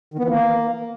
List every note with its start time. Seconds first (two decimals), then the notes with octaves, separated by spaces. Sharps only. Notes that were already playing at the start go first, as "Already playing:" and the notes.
0.14 D#3
0.19 B3
0.24 E3
0.29 A#3